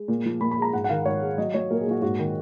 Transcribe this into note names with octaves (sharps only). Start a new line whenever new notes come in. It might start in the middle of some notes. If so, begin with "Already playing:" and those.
Already playing: G#3
A#2
F3
A#2 B5
B5
G#3 A#5
G#2 F#5
F#5
D#3 F5
G#2 C#5
G#3
F#3 D#5
F#3 C#5
A#2 A#4
G#4
A#2 F#4
G#2 F#4
D#3